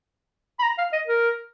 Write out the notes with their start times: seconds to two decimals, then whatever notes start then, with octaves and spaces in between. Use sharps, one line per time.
0.59 B5
0.63 A#5
0.78 F5
0.93 D#5
1.08 A#4